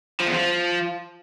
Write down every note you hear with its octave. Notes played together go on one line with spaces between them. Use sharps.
F3
E2
F3